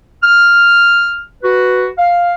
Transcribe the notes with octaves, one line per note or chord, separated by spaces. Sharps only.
F6
F#4 B4
F5